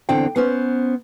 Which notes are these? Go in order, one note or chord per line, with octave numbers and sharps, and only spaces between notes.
E2 D3 C4 D4 G5
B3 C#4 C5